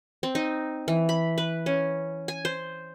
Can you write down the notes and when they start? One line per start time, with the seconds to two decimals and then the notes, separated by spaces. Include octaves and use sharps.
0.23 C4
0.35 D#4
0.88 E3
1.09 B5
1.38 B4
1.66 C#4
2.28 G#5
2.45 C5